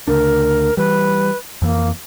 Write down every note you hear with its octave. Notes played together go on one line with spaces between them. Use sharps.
D2 C#3 D4 A#4
E3 G3 B4
F2 E3 A#3